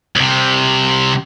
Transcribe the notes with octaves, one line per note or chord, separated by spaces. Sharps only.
C2 C3